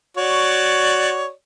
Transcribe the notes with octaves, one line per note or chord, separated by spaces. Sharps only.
F#4 C#5 D5